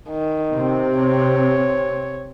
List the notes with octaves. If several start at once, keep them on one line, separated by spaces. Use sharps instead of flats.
D#3
C3 C4
C#5